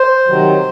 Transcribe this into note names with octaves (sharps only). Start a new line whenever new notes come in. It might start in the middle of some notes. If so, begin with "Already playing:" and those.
Already playing: C5
C3 D#3 F#3